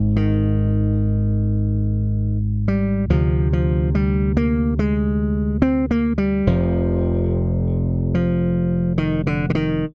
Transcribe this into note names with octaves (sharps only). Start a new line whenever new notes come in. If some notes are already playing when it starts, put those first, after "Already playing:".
Already playing: G#1 G#2
D#3
G3
D2 C3 F3
F3
G3
A#3
G#3
C4
A#3
G3
F1 F2 C3 F3
F3
D#3
D3
D3
D#3